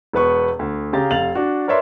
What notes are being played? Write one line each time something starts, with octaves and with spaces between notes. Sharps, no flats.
E1 B3 B4 C#6
D2
C#3 G4 F5 A#5 A6
F1 F5 A6 F7 F#7
D4 F#4
A#4 B4 C#5 D5 E5 C6